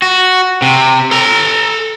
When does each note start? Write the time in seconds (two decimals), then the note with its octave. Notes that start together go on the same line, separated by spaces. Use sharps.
0.02 F#4
0.62 C3
1.11 A4 A#5